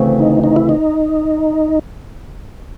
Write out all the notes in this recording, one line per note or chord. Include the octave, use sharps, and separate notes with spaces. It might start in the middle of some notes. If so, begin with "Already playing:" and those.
Already playing: D2 C#3 E3 A3 C4
D#4
D#4
E4
D#4